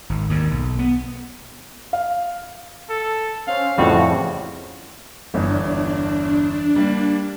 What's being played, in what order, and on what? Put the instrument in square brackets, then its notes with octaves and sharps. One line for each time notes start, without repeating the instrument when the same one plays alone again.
[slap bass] G#1
D#2 G#2 D#3
B1
B3
[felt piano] F5
[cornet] A4
[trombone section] C#4 C5 [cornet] F5
[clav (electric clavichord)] F2 A2 G3 [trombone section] C#3 E3 F3 [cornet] F#4
[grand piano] G1 E2 C#5 [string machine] D4
[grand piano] G3 A#3